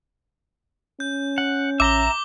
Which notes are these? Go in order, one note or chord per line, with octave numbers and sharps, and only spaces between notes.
C#4 G6
F#5
A1 E5 A#5 D6 G7